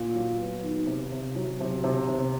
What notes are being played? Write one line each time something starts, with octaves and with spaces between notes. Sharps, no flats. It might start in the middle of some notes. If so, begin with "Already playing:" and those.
Already playing: A#2
F#3
B3
D#3
C3
C3
F#3
C3
C3
C3